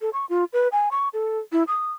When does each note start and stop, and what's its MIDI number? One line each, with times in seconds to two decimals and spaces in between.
0.01 0.10 69
0.13 0.25 85
0.29 0.44 65
0.53 0.68 71
0.72 0.89 80
0.91 1.08 85
1.13 1.39 69
1.52 1.64 64
1.68 1.92 87